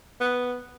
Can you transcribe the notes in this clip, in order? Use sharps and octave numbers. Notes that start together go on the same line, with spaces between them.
B3